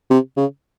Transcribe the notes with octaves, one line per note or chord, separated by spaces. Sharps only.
C3
C#3